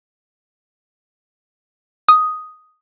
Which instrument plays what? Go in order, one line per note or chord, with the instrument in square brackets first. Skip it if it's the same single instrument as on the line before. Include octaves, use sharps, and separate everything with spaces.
[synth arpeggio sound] D#6